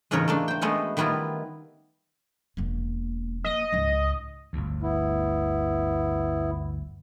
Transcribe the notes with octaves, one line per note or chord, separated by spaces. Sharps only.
E2 G#2 C#3 F4 A#4 C#5
A3 A#3 D4
C5 G5
G#3 A3 B3 C#4 F#4
D#3 G3 B3 E4 F4
E1 A#3
A#3 D#5
C#2 G#2
G1 D2
B3 E4